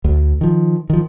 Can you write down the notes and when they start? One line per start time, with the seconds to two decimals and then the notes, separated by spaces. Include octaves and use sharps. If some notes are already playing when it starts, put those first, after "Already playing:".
0.04 D2
0.41 D#3 F3
0.90 D#3 F3